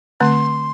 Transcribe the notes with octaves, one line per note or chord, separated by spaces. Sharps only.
D3 A3 C4 C6